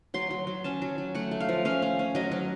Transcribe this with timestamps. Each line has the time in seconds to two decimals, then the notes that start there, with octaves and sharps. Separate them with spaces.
0.14 F#3 C6
0.31 F#3
0.47 F#3
0.64 C#4 A5
0.82 F#3
0.98 F#3
1.15 A3 F#5
1.31 A3
1.40 F5
1.49 F3
1.65 C#4 F5
1.82 C#4
1.99 C#4
2.15 F#3 D#5
2.32 F#3